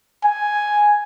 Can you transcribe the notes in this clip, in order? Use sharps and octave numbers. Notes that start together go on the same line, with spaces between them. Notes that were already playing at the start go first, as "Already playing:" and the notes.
G#5